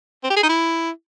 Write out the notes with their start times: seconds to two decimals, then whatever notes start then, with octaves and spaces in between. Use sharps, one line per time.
0.24 C4
0.30 G4
0.37 G#4
0.43 D#4
0.49 E4